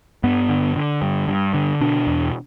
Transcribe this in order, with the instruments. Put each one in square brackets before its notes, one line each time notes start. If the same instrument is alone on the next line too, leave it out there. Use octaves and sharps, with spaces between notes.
[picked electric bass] G2 B3
D3
D3
G2
G2
D3
B2 D4
E2